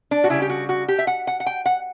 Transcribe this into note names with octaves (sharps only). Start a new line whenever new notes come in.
D4
F#4
C#3 G3 E4
G4
F#4
F#4
G4
E5
F#5
F#5
F#5
G5
F#5